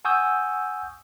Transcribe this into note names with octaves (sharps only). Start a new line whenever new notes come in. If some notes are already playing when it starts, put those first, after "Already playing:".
F#5 G#5 C#6 D#6 E6 G6